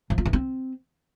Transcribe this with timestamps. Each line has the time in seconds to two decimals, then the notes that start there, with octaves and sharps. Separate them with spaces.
0.10 F3
0.18 F4
0.25 E3
0.33 C4